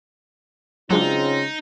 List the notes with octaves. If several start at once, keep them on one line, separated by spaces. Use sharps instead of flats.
G#2 C#3 F#3 G#3 C4 D4 D#4 F4